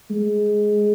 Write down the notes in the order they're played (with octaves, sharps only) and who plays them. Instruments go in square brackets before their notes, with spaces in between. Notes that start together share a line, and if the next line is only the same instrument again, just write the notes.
[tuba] G#3